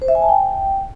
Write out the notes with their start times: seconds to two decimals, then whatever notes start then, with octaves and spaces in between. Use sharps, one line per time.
0.02 C5
0.08 E5
0.15 G#5
0.22 A5
0.29 G5